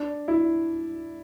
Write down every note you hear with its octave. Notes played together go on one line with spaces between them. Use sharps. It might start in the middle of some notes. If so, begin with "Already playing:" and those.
Already playing: D4
E4